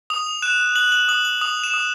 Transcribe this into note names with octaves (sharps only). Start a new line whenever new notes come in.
D#6 F7
F#6 E7
F#6 F#7
F#7
D#6 F#7
F#7
D#6 F7
E7
D#6